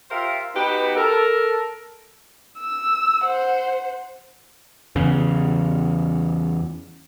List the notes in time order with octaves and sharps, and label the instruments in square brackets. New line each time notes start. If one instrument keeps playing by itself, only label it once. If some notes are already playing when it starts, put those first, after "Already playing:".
[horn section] F4 G4 A#4 C5 E5 F5
B3 D#4 F#4 G4 B4
A4 A#4
[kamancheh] E6
C5 F#5
[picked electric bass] E2 C#3